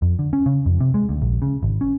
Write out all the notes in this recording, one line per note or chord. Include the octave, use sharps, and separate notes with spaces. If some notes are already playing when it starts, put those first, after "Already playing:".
F2
D3
C#4
C#3
F2
C3
G#3
D2
A#1
C#3
G#1
C#4